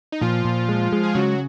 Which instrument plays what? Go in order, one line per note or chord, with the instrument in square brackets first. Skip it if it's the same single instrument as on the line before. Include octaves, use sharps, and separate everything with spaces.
[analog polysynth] D#4
[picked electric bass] A#2 [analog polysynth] F3 F4
[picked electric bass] A#2
G#3
G#3
[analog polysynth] G#4
[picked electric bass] C#3 [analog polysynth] F#3 F#4